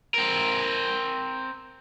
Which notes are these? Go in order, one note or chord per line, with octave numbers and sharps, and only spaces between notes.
C4 A#4